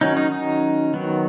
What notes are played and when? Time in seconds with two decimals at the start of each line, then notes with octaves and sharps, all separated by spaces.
0.01 D#3 F#3 C#4 D#4
0.17 D#4
0.32 D#4
0.94 D#3 F#3 B3